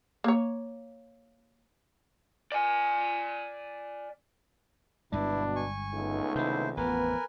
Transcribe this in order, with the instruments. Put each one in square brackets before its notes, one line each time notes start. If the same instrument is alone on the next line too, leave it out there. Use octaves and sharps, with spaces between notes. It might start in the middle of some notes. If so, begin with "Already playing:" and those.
[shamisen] A#3 C#5
[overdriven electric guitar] D5 G#5
[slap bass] G1 G2 G#3 [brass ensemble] B2 [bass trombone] D4 [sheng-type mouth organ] E4
[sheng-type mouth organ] G#5 C#6
[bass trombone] C#2 [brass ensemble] A3 B3 D#4
[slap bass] C3 D#3 [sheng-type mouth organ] E4 C5
[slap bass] A1 F2 [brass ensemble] F3 B3 [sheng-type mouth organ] A#4 B4 G#5